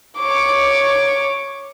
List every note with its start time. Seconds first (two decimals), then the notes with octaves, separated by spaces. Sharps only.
0.19 C#5 D6